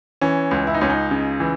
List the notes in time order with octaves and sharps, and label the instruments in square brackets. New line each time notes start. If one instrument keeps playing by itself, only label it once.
[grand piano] E3 C#4
C#2
E4
D#4
C#2 C#4
D#4
C#3
E3